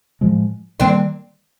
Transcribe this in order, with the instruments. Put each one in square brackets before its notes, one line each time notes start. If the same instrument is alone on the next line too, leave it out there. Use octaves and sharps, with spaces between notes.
[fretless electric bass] A2 F3 G#3
[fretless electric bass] D#3 G3 A#3 [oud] C4 D4